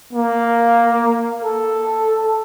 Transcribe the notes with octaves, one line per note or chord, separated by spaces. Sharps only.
A#3
A4